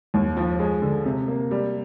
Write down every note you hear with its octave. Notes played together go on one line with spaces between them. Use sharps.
D#2
F3
G#3
D3
C3
A#3
G3